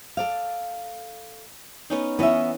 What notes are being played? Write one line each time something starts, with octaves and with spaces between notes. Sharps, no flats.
A4 D5 F5
B3 C#4 D#4
E3 B3 C#4 D#5 E5